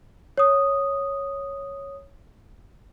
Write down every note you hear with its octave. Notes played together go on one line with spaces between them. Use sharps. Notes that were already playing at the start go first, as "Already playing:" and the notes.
C#5 D#6